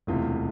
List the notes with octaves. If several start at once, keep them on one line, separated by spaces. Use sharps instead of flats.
E1 D2 C3 E3 F4